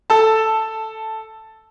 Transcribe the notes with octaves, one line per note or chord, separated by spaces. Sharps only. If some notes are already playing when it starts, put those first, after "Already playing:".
A4 A5